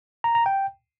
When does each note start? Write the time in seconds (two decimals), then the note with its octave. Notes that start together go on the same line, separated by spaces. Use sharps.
0.24 A#5
0.35 A#5
0.46 G5